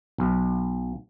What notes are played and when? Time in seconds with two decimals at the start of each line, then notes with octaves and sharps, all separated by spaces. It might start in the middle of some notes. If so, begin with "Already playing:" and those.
0.18 B1